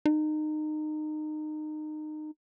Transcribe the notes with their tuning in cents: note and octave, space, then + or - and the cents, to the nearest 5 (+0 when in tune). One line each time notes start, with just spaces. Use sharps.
D#4 -25